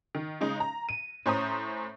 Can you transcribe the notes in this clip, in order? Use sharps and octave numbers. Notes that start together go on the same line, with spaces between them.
D#3
C#3 G#3 D#4
A#5
D#7
A2 C#4 C5 A#5 D#6